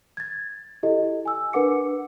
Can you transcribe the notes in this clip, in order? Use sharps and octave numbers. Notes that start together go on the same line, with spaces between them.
G#6 A6
E4 G4 A4 D#5
G#5 E6
D4 A#4 B4 F#5 D6 C#7